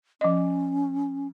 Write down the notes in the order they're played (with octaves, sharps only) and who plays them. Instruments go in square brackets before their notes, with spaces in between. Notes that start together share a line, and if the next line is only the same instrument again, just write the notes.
[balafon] F3 D#5 [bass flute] C#4